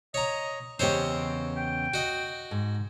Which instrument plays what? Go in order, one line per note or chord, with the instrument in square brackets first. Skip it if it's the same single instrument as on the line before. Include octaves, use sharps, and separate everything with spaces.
[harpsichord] C#5 A#5 [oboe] D#5
[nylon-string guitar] E2 C#3 G4 [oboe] C4 [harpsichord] C5 C#5 D#5
[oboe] G5
[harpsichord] F#4 D#5
[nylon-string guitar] G#2